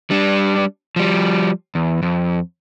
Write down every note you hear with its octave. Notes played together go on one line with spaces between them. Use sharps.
G3 D4
F3 G3
E2
F2